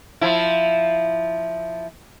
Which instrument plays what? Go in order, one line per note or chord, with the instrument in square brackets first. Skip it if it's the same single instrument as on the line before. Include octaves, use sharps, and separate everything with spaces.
[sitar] F3 E4